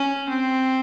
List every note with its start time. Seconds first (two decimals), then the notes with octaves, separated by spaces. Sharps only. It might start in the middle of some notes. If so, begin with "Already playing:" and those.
Already playing: C#4
0.29 C4